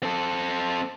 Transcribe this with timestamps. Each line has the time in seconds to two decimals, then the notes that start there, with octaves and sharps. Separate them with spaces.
0.03 C4 A4